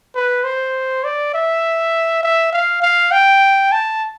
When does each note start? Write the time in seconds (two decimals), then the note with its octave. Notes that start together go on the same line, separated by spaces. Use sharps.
0.15 B4
0.44 C5
1.04 D5
1.34 E5
2.23 E5
2.53 F5
2.82 F5
3.12 G5
3.72 A5